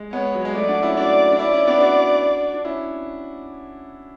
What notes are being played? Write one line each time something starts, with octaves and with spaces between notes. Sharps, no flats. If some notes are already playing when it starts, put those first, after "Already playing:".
Already playing: G#3
G#3 B3 C#5
F#3
G#3
F#3 A3 D5
D4 F#4
C#4 E4
D4 F#4 D5
D4
C#4 E4 D5
C#4 E4
B3 D4
D4 F#4
D4
C#4 E4